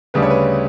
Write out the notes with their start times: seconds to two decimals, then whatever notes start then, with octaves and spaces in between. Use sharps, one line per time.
0.14 D2 C#3 G3 D4 B4
0.22 C#5
0.30 B4